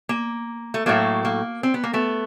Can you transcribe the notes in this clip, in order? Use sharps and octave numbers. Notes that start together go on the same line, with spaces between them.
A#3
A3
A2 F#3 A3 A#3
A#3
C4
B3
A#3
A3 B3